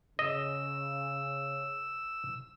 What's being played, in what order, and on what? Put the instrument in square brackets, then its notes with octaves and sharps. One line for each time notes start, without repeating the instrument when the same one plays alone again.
[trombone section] C#3 [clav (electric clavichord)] D#5 [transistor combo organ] E6